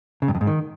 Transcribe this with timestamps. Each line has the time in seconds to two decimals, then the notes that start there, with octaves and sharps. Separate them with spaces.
0.22 C#3
0.28 G2
0.35 F2
0.41 G#2
0.47 D#3